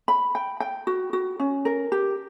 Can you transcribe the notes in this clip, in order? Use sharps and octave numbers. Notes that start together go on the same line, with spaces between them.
B5
G5
G5
F#4
F#4
C#4
A#4
G4